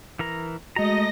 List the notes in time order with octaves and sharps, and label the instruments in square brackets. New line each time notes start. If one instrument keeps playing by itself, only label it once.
[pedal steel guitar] E3 A#4 A#5
[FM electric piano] G#3 F#4 [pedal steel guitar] A3 A#5 [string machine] D#5 A#6